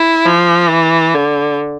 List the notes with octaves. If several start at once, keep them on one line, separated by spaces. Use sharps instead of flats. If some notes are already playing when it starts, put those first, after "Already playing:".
Already playing: E4
F3
E3
D3